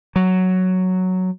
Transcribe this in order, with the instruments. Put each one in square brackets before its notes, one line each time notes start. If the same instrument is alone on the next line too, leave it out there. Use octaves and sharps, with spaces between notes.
[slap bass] F#3